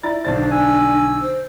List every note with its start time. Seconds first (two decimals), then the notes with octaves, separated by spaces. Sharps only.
0.03 E4 D5 A#5 A6
0.25 B1 D3 D4 C5 D5 A6
0.51 G#5 E6
1.22 C5